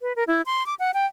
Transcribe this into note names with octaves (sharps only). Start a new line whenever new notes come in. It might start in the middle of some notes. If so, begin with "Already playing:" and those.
B4
A#4
E4
C6
D6
F#5
G5